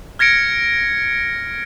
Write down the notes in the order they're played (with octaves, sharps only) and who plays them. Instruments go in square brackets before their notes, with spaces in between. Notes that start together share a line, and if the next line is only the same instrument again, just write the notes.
[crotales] F6 G#6 A#6 C#7 D7